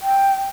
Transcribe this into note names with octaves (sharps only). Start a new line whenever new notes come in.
G5